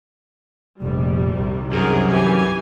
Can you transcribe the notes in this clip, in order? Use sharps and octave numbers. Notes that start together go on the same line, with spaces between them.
F1 A#1 G3
C2 C3 D#3
F#2 F#3 G#4 A#4
E3 G4 G#5